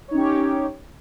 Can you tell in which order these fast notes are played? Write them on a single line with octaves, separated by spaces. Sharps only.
C#5 D#4 C#4 G4